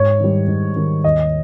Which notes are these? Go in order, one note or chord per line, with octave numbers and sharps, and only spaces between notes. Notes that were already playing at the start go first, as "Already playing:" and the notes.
Already playing: G#2 C#5
D#3 G3
G#2
D#3 G3
D#2 D#5